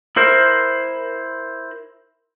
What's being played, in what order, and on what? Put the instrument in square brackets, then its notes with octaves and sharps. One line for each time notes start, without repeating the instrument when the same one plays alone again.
[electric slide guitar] E4 A#4 C5